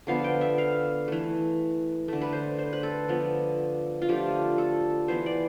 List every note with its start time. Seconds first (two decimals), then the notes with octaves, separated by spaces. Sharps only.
0.07 D3 F3 B3 F5
0.24 G5
0.41 E5
0.58 F5
1.08 E3 A3
2.08 D3 A3
2.21 B4
2.33 C5
2.58 C5
2.73 B4
2.83 A4
3.08 D3 F3 B3
4.02 F4
4.08 D3 F3 A3 G4
4.58 A4
5.08 E3 B3 C5
5.26 D5